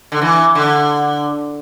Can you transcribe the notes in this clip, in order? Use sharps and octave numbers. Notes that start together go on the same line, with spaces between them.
D3
E3
D3